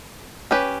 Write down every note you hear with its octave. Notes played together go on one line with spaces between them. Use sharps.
C#4 G4 B4